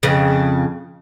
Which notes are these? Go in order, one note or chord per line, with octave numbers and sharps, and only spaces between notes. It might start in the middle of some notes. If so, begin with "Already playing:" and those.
F2 C#3